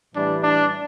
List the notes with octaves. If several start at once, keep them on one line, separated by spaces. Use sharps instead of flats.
A2 E3 G3 D4
D4